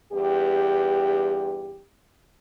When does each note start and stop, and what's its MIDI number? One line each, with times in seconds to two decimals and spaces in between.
0.12 1.82 40
0.12 1.82 43
0.12 1.82 67